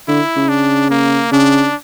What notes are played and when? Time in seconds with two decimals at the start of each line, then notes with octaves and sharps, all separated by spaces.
0.08 D3 E4
0.36 C#3
0.49 D4
0.90 A#3
1.31 C#3 D4